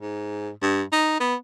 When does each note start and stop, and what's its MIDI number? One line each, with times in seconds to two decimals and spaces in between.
0.01 0.50 44
0.62 0.82 43
0.93 1.17 63
1.21 1.35 59